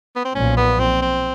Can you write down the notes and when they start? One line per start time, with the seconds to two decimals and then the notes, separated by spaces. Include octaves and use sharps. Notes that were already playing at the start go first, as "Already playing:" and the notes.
0.16 B3
0.25 C4
0.35 B1 A#2 F3 C#4
0.57 B3
0.80 C4
1.02 C4